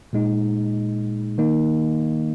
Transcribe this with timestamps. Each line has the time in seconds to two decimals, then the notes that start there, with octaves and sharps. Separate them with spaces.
0.13 A#2 G#3 D#4
1.38 D#3 A#3 D#4